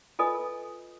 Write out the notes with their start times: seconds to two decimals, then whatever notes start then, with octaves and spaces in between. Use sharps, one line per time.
0.19 F4 A4 B4 D#5 G#5 D#6